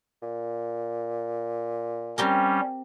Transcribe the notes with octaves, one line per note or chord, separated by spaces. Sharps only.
A#2
G3 C4 C#4 G4 A#4